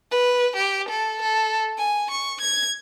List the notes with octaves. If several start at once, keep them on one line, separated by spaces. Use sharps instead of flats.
B4
G4
A4
A4
G#5
C#6
G#6